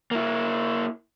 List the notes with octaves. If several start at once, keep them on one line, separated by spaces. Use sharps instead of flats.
A#3 E4